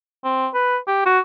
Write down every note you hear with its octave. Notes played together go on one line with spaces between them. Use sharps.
C4
B4
G4
F#4